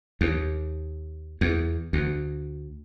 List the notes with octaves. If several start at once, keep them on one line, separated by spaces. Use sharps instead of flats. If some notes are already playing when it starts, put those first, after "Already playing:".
D#2
E2
D2